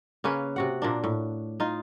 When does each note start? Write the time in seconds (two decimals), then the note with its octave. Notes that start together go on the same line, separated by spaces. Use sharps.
0.24 C#3 A#3 C#4 B4
0.56 C3 F#4 F#5
0.82 A#2 A#3 D4
1.04 A2
1.60 D#4 F4